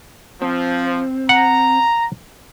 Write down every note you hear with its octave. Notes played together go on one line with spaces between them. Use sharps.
F3 C4
F#5 A#5